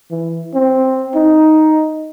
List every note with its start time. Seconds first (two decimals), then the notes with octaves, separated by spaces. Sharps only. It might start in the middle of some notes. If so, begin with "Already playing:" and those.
0.11 E3
0.55 C4
1.15 D#4